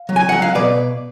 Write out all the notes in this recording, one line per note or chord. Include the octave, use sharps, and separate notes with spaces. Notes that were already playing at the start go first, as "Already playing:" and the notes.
Already playing: F5
F#3
G#5
F#3 F#5
F5
B2 B4 D5